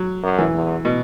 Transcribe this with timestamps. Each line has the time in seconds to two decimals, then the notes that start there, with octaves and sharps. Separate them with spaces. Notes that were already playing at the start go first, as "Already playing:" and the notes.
Already playing: F#3
0.23 F#2
0.38 E3
0.54 E2
0.85 B2